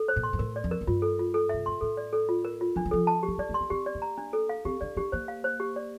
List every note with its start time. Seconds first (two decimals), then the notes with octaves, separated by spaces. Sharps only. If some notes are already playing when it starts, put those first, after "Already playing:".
Already playing: A4
0.08 C5
0.16 A#2
0.23 C6
0.33 G2
0.39 A2 A#4
0.56 D5
0.64 F2
0.71 A#4
0.81 F2
0.87 G2 F4
1.02 A4
1.19 F4
1.34 A4
1.49 C3 E5
1.66 A#2 C6
1.81 A2 A4
1.97 D5
2.13 A4
2.29 F4
2.45 A#4
2.61 F4
2.76 F3 D4
2.85 G3
2.91 F3 A4
3.07 A5
3.23 G4
3.28 F3
3.38 G3 D5
3.49 A3
3.54 C6
3.61 A#3
3.70 C4 G4
3.86 D5
3.95 A#3
4.02 A#5
4.18 D4
4.33 A4
4.49 F5
4.65 C4 G4
4.81 D4 D5
4.97 D4 G4
5.12 A#3 C5
5.28 F5
5.44 C5
5.60 G4
5.76 D5